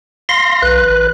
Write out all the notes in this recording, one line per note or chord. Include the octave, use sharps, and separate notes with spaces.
F5 C6 A#6
B1 B4 F#6
A1